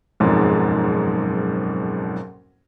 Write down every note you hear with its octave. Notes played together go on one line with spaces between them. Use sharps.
F#1 B1 F2 G#2